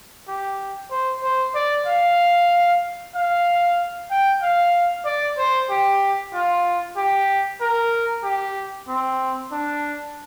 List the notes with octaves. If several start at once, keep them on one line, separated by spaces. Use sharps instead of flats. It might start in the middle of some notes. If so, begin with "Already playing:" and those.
G4
C5
C5
D5
F5
F5
G5
F5
D5
C5
G4
F4
G4
A#4
G4
C4
D4